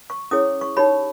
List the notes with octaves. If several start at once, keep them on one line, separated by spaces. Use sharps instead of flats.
C#6
C#4 E4 G#4 C#5 D#6
C#6
D#4 G4 C#5 B5